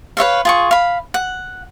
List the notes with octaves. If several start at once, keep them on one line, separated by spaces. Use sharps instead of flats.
B4 C#5 E5 F5
F4 G#4 C#6
F5 B5
F#5